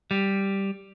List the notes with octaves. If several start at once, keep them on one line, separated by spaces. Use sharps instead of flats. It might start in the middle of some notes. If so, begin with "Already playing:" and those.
G3